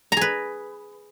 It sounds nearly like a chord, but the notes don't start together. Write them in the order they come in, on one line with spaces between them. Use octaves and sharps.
A#5 G#4 B4